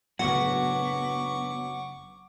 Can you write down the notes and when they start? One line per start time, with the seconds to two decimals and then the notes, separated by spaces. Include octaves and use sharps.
0.19 F#1 A2 F#3 B3 D4 F#5 C#6 D6